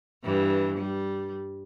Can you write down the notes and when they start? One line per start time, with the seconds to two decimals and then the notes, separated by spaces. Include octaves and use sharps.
0.23 G2 E3
0.77 G3